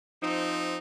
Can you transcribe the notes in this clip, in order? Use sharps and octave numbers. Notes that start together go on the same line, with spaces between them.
F3 C4 D#4